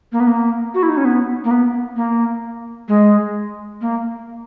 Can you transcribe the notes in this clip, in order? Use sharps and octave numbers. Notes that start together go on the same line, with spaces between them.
A#3
B3
A#3
F#4
E4
D#4
C#4
B3
A#3
B3
A#3
G#3
A#3